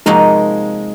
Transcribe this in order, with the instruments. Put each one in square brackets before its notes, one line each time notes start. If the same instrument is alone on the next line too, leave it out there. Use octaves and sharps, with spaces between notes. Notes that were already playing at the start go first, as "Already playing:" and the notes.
[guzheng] C3 F3 A#3 D#4 F#4 [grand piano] G#3